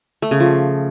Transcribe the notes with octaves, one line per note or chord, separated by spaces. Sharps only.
A3
C#3
F3